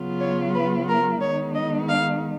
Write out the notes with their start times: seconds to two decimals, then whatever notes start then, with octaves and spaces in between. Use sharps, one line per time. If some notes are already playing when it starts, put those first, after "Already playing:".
Already playing: C#3 F#3 B3 F4
0.20 C#5
0.54 B4
0.88 A#4
1.21 D#3 G#3 B3 D#4 C#5
1.54 D#5
1.88 F5